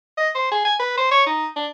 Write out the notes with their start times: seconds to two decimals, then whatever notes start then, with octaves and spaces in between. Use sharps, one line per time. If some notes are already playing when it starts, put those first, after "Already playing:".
0.17 D#5
0.35 C5
0.51 G#4
0.65 G#5
0.80 B4
0.97 C5
1.11 C#5
1.26 D#4
1.56 D4